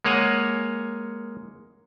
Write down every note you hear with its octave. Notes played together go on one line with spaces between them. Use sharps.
G#3 A#3 C#5 F#5 G#5